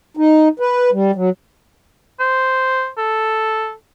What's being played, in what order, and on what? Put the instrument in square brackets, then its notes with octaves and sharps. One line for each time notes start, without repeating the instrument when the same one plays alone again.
[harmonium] D#4
B4
G3
F#3
[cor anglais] C5
A4